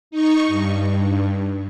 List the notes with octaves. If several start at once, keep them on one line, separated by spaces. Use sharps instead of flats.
D#4 C#6
G2